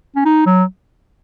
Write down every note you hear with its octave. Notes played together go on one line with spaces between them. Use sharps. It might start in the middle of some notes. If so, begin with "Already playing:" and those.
C#4
D#4
F#3